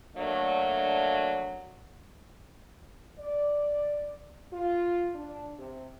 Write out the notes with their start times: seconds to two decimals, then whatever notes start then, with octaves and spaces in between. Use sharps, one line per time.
0.16 F#3 A3 A#3 D4
3.19 D5
4.53 F4
5.15 D4
5.59 C3